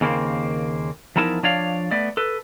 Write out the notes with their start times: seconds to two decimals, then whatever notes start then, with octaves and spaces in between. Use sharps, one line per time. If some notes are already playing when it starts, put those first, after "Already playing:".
0.01 D#2 C#3 A#3 C4
1.16 E2 F3 D#4 E4 A#4 A5
1.43 F3 D4 C#5 D5 F5
1.91 A3 B3 D5
2.17 A4 B4